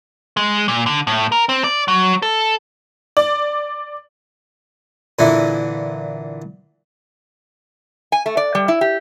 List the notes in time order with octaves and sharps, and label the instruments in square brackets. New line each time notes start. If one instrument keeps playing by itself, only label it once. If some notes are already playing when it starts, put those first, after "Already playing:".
[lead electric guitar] G#3
A#2
D3
A2
A#4
C4
D5
F#3
A4
[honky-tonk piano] D5
[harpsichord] A#2 D3 E3
[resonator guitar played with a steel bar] G#5
A3
D5
G3
E4
G4